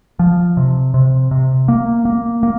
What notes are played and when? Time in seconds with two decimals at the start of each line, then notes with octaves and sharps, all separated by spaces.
0.19 F3
0.57 C3
0.94 C3
1.31 C3
1.68 A#3
2.05 A#3
2.43 A#3